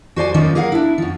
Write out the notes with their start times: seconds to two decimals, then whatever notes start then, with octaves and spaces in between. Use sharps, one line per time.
0.16 F#4 C5 D5 G#5
0.34 D#3 F3 A#3 C#4 D#4 D5
0.55 A#3 G#4 A#4 F5 F#5
0.72 D4 E4
0.98 F#2 F3